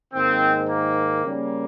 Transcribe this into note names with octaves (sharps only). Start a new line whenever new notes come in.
G#2 D#3 A#3 C4
A#3
C#3 G3 A#3